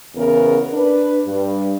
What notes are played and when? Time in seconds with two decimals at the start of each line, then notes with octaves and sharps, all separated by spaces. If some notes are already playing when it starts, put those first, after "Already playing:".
0.15 E2 C#3 B3 A#4
0.73 D4 B4
1.25 G2